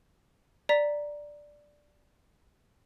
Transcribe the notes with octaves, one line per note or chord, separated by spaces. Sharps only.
D5 A#5 B6